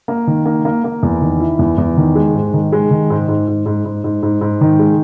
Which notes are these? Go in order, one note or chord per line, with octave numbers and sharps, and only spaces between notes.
A#3
D#3
A#3
A#3
A#3
E2
D#3
E4
E2
E2
D#3
G#3
G#2
D#3
G#3
D#3
G#2
G#2
G#2
G#2
G#2
G#2
G#2
G#2
D#3
G#3